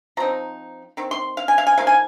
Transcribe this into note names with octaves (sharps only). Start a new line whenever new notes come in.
F3 C4 D#4 A#5
D#3 C4
C6
F5
G#5
F5
G#5
F3 A#3 D#4 F5
G#5